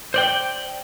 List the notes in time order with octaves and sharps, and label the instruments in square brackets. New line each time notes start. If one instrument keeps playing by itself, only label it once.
[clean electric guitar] C5 D5 G5